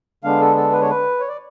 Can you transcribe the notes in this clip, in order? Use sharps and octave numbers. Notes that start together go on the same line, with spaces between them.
D3 G#3 B3 D4 F5
A4
A4
B4
C#5
B4
C#5
D5